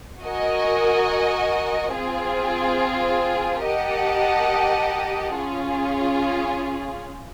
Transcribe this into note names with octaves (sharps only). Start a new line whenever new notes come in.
F#4 A#4 D#5 G#5
C4 F4 G#4
G4 A#4 D#5 F#5 A5
C#4 F4 G#4